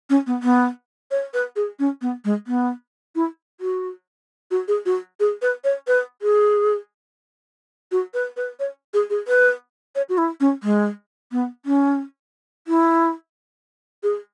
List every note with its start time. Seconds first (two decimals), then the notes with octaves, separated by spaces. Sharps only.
0.10 C#4
0.27 B3
0.43 B3
1.11 C#5
1.34 B4
1.56 G#4
1.79 C#4
2.02 B3
2.25 G#3
2.47 B3
3.15 E4
3.61 F#4
4.51 F#4
4.68 G#4
4.86 F#4
5.20 G#4
5.42 B4
5.64 C#5
5.87 B4
6.22 G#4
7.92 F#4
8.14 B4
8.37 B4
8.60 C#5
8.94 G#4
9.10 G#4
9.28 B4
9.95 C#5
10.09 F#4
10.18 E4
10.40 C#4
10.63 G#3
11.32 B3
11.66 C#4
12.68 E4
14.03 G#4